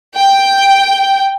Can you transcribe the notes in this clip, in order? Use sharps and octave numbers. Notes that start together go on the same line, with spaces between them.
G5